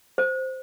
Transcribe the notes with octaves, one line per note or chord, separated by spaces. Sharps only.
C5